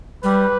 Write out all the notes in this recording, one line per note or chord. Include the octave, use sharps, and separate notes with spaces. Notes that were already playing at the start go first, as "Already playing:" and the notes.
G3 B4